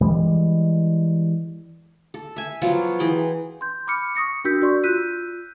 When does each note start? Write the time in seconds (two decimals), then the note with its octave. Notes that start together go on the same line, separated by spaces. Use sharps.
0.01 E3 G3 G#3
2.14 A4
2.36 E5 G#5
2.62 F3 F#3 B3 F4
2.99 E3 G#4 G5 C6
3.61 C6 G6
3.87 B5 D6 F6 C#7
4.15 C#6 D#6 A#6 C#7
4.45 D4 F#4 A#4 E6 G6 B6
4.62 F#4 D5 C6 C#6
4.84 F4 E6 F#6 G6 B6 D#7